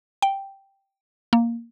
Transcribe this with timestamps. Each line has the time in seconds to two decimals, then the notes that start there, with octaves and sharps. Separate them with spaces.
0.22 G5
1.33 A#3